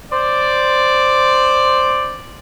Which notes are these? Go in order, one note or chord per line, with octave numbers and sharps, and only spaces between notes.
C5 D5